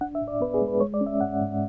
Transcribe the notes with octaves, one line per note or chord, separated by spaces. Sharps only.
D4 F#5
E5
A2
D5
B3 B4
G#4
G#3
B4
G#3 C#5
D5
C#4
E5
G#2 F#5
G#2